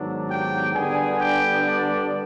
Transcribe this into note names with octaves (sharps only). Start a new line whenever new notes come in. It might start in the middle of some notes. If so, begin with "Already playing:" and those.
Already playing: G#2 D#3 F#3 B3 D4
G4 G5
D3 G3 B3 D4 G#4 G#5
G4 G5
D4 D5